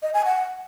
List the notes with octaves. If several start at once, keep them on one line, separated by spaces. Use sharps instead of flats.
D#5
G#5
F#5